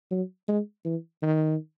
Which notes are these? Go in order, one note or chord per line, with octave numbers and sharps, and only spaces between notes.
F#3
G#3
E3
D#3